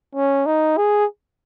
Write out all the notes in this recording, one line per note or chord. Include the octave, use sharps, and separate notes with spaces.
C#4
D#4
G#4